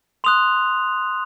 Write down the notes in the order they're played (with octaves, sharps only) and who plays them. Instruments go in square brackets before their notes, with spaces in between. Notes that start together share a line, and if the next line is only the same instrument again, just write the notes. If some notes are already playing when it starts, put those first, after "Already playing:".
[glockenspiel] C6 D#6 F#6 F7